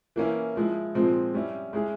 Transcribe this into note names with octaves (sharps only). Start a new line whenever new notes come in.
E3 A#3 C#4 E4
F3 G#3 E4
A#2 F3 G#3 C4
G3 C#4 E4
G#3 C#4 E4 G#4